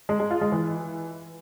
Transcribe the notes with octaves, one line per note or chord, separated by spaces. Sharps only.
G#3
G#3
F4
G#3
E3